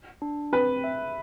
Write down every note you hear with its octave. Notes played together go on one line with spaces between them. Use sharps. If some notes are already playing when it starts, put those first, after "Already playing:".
D4
C4 B4
E5